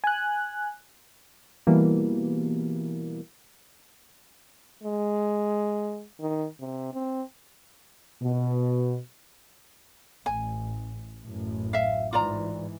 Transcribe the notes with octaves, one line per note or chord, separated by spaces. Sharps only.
G#5 F#6
B2 E3 G3 A#3
G#3
D#3
C3
C4
B2
A1 G#5
A1 F#2 A2
E5 F5
G#2 E3 F4 D5 A#5